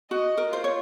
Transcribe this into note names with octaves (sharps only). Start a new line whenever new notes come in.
F#4 D#5
A#4
F4 C5
C#5